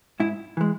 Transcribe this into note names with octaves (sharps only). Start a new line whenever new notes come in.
G#2 E4
E3 G#3